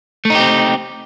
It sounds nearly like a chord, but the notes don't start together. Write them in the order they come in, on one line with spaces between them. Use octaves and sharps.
A3 D#4 G4 C4